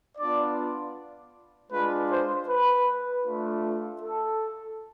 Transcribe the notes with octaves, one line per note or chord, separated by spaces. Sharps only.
B3 D4 F4 D5
G#3 D4 F4 B4
C5
B4
A3 D4 F4
A4